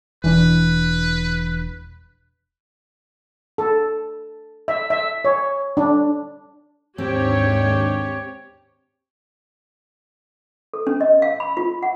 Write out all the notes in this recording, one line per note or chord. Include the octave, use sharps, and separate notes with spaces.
E1 E3 D4 B4
A4
E5
E5
C#5
D4
D#2 G#2 C4 D4 G4 C#5
A4
C#4
D#5
F5
B5
F4
F#5